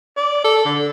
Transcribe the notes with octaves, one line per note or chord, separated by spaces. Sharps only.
D5
A4
D3